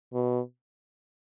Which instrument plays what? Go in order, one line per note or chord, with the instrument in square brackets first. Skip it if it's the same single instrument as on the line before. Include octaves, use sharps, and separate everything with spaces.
[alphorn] B2